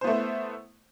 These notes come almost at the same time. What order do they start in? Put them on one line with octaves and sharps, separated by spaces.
C5 B3 A3 E4